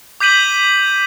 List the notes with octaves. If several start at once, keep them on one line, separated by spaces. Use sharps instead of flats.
D6 G6 B6 D#7 F#7